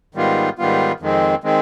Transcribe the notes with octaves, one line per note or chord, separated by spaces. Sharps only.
G#2 D#3 G3 B3 F4
G#2 D#3 G3 B3 F4
F2 D#3 G#3 C4
D#3 G#3 C4